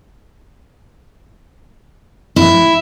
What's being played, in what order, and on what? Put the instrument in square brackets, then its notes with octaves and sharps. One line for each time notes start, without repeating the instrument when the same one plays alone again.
[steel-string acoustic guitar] E4